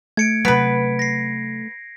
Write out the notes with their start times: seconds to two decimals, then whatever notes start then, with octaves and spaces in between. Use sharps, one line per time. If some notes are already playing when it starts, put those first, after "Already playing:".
0.17 A3 G#6 C#7 D7
0.45 C3 F#3 B3 B4 B6 D7
0.99 A#6 C7